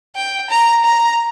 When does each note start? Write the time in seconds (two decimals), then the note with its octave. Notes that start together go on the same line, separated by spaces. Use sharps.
0.15 G5
0.50 A#5
0.85 A#5